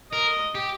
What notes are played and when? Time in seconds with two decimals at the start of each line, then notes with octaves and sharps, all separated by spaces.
0.13 A#4 D#5
0.55 G4